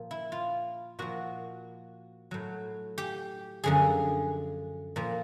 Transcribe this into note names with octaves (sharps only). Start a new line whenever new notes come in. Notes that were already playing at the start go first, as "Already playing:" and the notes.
Already playing: A#2 F3
E4
F4
A#2 F3 F#4
A2 F#3
G4
F#2 D3 F3 G#4
A#2 F3